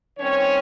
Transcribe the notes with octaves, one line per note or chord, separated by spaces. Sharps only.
D#3 G3 C4 C#4 C#5